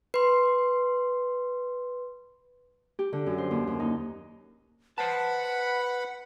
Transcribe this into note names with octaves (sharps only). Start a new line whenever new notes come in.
B4 C6
G4
D3
F#2
C5
D#2
D#2
D#4
B4 C5 F#5 A5 B5